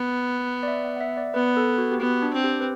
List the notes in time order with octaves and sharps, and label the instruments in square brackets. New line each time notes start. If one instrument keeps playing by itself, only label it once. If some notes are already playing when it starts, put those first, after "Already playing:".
Already playing: [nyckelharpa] B3
[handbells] D5
E5
F#5
F#5
E5
D5
[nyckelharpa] B3 [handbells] B4
[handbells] A4
F#4
G4
[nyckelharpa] B3 [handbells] F#4
[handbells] D4
[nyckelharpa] C4
[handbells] G4
B4